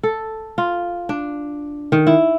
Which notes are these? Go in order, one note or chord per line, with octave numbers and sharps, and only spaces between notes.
A4
F4
D4
D#3
E4